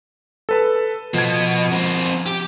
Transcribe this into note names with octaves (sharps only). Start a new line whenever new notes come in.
A4 B4 A5
B2 F3 G#6
C4 A#4
G4